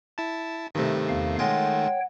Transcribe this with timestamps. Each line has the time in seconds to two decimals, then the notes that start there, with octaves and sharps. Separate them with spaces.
0.18 E4 A5
0.75 G2 C3 D#3 A3
1.09 E2 F5
1.39 G#3 F4 C#5 F#5 G5